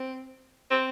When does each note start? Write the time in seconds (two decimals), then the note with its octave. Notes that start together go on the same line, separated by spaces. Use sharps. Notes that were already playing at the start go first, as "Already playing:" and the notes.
Already playing: C4
0.70 C4